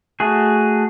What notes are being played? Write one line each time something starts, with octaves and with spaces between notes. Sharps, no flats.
A3 F#4 G#4